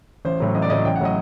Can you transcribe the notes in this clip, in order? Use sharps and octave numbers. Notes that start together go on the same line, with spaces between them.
A1 C5
A2 F#3
A1 D#5
D5
A2 F#3 D#5
A1 G5
F#5
A2 F#3 D#5